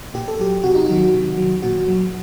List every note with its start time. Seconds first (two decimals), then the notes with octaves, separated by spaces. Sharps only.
0.14 A#2 G4
0.28 A4
0.40 F#3 G4
0.64 C3 F#4
0.75 D#4
0.86 D#3 F#3 F#4
1.14 C3
1.38 D#3 F#3
1.63 A#2 F#4
1.88 F#3